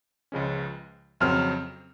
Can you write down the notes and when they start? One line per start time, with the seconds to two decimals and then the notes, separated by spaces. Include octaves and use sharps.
0.32 C#2 C#3 F3 G#3 C#4
1.20 F2 C#3 F#3 C4 F6